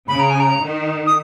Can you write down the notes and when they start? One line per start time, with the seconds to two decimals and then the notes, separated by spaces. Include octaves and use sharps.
0.08 C#3 B5
0.19 A#5
0.30 G#5
0.40 A#5
0.61 D#3
1.07 D#6